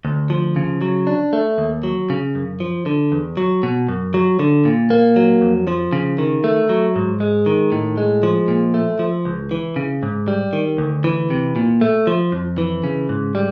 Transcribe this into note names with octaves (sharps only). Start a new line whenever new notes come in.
D2
F3
C#3
F#3
D4
A3
D#2
F#3
C#3
F#2
F3
D3
E2
F#3
B2
F#2
F#3
D3
A#2
A#3
F#3
F2
F3
C#3
D#3
A3
F#3
G#2
G#3
D#3
A2
G#3
F3
A#2
A3
F3
C#2
E3
C#3
G#2
G3
D#3
D2
E3
C3
A#2
A3
F3
F2
E3
C#3
G#2
G3